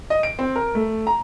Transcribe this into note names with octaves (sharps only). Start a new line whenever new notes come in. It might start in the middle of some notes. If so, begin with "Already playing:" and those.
D#5
D7
C4
A#4
A3
A#5